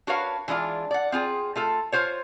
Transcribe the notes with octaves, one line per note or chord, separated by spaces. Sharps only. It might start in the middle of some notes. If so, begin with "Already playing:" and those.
D4 F#4 A#4 B4 C#5 F5
E3 G#3 D4 F4
D5 F#5
C4 F4 G#4
A3 F4 A4
F4 C5 C#5